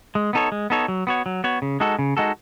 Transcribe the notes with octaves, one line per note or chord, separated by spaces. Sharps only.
G#3
B3 D#4 A4 C#5
G#3
B3 D#4 A4 C#5
F#3
B3 F#4 C#5
F#3
B3 F#4 C#5
C#3
G#3 D#4 F#4 A4
C#3
G#3 D#4 F#4 A4